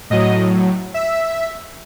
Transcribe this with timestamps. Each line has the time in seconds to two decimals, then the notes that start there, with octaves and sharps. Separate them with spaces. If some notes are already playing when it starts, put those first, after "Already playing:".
0.10 A2 F#3 D#5
0.94 E5